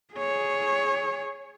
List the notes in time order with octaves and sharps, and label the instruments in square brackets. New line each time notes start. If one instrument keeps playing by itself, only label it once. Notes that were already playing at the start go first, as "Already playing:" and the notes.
[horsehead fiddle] G#4 C#5